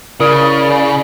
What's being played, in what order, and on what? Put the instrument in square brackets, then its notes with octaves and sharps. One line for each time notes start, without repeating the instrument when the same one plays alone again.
[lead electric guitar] C#3 [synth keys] E4 A#4 D#6 [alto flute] D5